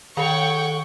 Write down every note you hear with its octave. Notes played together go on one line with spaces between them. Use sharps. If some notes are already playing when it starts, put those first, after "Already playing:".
D#3 A4 C#5 F#5 G5 C#6